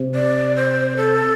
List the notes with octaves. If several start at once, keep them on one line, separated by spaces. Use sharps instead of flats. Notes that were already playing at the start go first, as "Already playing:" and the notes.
Already playing: C3
D5
C5
A4